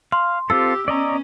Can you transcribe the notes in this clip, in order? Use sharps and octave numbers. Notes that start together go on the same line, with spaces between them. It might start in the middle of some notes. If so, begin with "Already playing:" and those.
F5 C6
C4 F4 G4 A4 E6
B3 C#4 D5 D#5 A#5